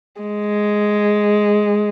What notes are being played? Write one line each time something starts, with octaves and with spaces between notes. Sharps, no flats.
G#3